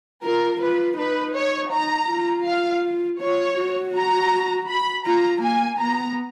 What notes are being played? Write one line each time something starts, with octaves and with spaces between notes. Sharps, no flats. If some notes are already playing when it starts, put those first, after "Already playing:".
F4 A#4
F4 B4
D#4 B4
C#5
D#4 A#5
F4
F5
F4 C#5
F#4
A#5
B5
F4 A#5
A#3 G#5
B3 A#5